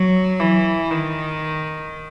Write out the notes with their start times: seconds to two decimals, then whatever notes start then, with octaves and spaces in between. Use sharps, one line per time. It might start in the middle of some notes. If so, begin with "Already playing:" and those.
Already playing: F#3
0.40 E3
0.91 D#3